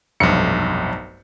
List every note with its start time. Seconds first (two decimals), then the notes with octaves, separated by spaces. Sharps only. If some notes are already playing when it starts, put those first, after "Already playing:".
0.20 F1 B1 G2 C#7